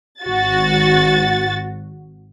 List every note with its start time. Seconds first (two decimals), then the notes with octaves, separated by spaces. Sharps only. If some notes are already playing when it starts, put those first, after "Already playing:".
0.23 G#1 F#4 A6